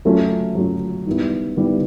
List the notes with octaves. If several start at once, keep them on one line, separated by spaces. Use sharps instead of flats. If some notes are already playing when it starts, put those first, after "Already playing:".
F#3 A3 C#4 F4
F#3 A3 C#4 F4
D#3 G3 B3 E4
D#3 G3 B3 E4